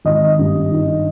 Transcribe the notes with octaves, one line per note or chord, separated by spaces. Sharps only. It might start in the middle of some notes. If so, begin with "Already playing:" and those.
G#1 D#5
G2
D#3